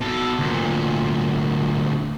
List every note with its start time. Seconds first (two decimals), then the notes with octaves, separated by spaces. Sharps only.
0.01 B2 A4
0.39 D2 A#2